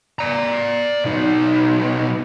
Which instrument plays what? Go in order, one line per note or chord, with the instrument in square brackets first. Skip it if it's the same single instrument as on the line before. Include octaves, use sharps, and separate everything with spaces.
[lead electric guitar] D5 A#5
B1 D#4